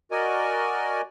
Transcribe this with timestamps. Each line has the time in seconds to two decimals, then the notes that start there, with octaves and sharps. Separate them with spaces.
0.11 F#4 A#4 D5 D#5 G#5